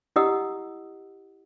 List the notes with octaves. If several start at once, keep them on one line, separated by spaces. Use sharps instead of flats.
E4 G4 D#5 F#5 D#6 E6